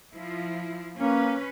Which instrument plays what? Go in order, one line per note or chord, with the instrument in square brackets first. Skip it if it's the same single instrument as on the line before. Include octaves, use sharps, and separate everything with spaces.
[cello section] F3 E4
[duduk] A#3 [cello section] C#4 B4